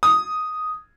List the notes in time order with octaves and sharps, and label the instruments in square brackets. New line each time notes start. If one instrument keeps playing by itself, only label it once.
[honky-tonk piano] D#6